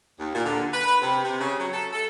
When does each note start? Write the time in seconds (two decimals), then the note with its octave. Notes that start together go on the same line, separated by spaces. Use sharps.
0.19 D#2
0.34 A#2
0.45 D3
0.73 B4
1.01 C3
1.23 C3
1.40 C#3
1.58 F#3
1.72 A4
1.93 A4